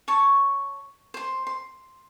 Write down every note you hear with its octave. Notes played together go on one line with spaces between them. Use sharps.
C#5 A5 C#6
C5 C6
C6